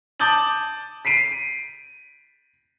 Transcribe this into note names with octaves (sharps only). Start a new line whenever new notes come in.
A5 D6 D#6 G6 A6 F#7
B6 C7 D7 D#7